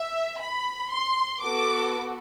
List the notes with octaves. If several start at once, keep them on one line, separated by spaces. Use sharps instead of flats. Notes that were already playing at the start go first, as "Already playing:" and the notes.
Already playing: E5
B5
C6
B3 F#4 A4 D6